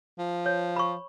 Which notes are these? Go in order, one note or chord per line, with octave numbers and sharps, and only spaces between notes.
F3
C#5
B5 C#6